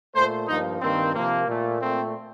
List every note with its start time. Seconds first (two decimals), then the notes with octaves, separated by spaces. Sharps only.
0.15 A#2 A3 C5
0.48 G2 F3 A#3 D#4
0.81 G2 D#3 A#3 C4
1.14 C3 F3 A#3
1.47 A#2 A3
1.81 A#2 A3 C4